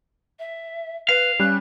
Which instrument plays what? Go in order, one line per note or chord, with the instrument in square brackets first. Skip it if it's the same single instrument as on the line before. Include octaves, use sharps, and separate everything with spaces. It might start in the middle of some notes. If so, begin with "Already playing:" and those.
[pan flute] E5
[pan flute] B4 [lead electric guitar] F5
[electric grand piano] G3 C#4 [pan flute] F#6